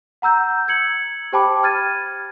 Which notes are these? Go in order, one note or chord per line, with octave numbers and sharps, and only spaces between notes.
F#5 A#5 E6 G6
G#6 C#7 F#7
G4 C5 G5 A5 B5 D6
F6 G#6 A6 D#7